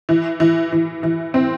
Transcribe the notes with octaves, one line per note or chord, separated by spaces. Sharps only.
E3
E3
E3
E3
C4